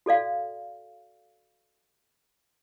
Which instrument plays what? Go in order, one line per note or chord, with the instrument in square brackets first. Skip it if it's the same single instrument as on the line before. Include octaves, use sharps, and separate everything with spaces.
[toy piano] F#4 A4 D5 F5